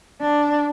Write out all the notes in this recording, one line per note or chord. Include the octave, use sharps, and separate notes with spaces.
D4